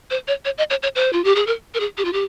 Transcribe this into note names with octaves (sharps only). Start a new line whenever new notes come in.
C5
C#5
C#5
D#5
C#5
C#5
C5
F4
G4
G#4
A#4
A#4
G#4
G4
F4
G4